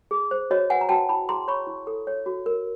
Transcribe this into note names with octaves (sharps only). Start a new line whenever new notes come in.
G#4
C5
F#4 C#5 D#5
B4 F#5 G#5
A#5
F#4 G5 A5
E4 A5 B5
G#4 A#5 C6
C#5 B5 C#6
E4
A4
C#5
F#4
A#4